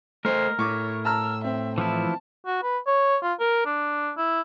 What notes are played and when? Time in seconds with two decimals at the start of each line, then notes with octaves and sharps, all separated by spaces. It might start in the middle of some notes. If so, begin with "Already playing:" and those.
0.25 A3 A#4 C5 D#5
0.59 A2 C#5 C#6 D6
1.05 A5 A#5 E6 F6
1.44 C4 E5
1.78 E3 F3 E4 A5
2.46 F#4
2.63 B4
2.87 C#5
3.23 F4
3.40 A#4
3.66 D4
4.17 E4